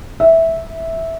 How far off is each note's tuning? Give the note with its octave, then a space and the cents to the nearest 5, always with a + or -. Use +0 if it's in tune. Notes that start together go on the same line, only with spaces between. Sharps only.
E5 -10